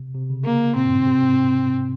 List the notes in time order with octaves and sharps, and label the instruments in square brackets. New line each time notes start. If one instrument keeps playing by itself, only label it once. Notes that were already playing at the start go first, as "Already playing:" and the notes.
Already playing: [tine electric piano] C3
C3
C#3
[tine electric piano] C#3 [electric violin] A#3
[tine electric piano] A#2 [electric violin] C4
[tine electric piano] G2
G#2
C3
G#2